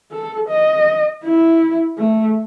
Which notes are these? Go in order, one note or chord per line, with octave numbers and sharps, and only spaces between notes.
A4
D#5
E4
A3